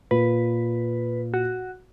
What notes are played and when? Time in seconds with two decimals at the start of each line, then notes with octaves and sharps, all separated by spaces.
0.11 A#2 B4
1.34 F#4